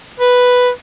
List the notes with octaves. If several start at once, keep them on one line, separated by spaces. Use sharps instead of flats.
B4